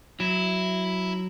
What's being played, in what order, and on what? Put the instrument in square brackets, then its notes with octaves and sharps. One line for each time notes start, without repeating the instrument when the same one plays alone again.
[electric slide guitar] F#3 [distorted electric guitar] E4